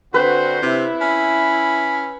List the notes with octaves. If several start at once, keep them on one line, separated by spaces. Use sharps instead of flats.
D3 C4 F#4 B4 C5
C3 E4
C#4 B5